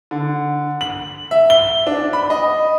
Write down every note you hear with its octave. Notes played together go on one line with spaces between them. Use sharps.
D3
F#7
E5
G7
D4
B5
D#5